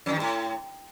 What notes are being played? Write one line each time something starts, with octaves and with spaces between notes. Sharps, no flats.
F2
D#3
G2
A2